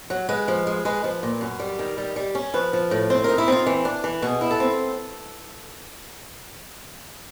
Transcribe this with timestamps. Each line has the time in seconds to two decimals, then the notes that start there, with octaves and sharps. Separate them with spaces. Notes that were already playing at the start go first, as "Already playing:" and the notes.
0.10 F#3
0.29 G#3 B4
0.48 F3
0.67 G#3
0.85 G#3 B4
1.04 F3
1.23 A#2
1.41 F#2
1.60 G3
1.79 D#3
1.98 G3
2.16 G3
2.35 C#4
2.54 F3 B4
2.73 F3
2.91 A2
3.10 C4 C5
3.24 D#4 A#4
3.38 E4
3.48 C4 F4
3.66 E3
3.85 D4
4.04 E3
4.22 B2 G#4
4.41 E4
4.51 A4
4.60 C4